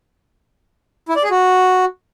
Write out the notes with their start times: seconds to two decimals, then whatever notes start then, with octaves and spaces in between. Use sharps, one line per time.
1.09 E4
1.16 D5
1.23 G#4
1.30 F#4